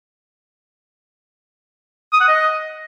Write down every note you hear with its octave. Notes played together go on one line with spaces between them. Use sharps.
D#6
F#5
D#5